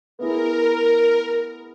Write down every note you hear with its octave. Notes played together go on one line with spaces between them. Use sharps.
B3 E4 G#4 A#4